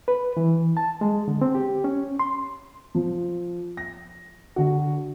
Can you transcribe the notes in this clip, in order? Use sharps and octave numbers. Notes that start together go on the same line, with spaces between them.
B4
E3
A5
G#3
D3
C4
G4
C#4
C6
F3
A#6
D3 F#4